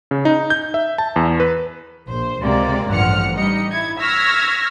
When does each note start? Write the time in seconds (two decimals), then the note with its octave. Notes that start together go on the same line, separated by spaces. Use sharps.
0.11 C#3
0.25 D#4
0.50 G6
0.74 E5
0.98 A5
1.16 E2
1.40 B4
2.06 A#1 C5
2.41 C#2 C3 G#3 A#3 D5
2.89 A1 G2 F3 F#5 F6 C#7
3.34 G2 G3 D#4 D#5 C#7
3.71 E4 G#6
4.00 C#6 E6 F6 G#6 A#6 B6